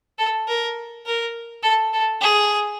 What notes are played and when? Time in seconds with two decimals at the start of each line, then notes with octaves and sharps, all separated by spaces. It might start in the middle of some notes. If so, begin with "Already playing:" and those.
0.19 A4
0.48 A#4
1.06 A#4
1.63 A4
1.93 A4
2.21 G#4